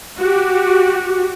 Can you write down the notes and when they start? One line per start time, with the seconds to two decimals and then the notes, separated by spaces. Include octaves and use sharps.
0.19 F#4 G4